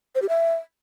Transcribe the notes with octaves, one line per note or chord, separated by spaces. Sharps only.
C5
G4
E5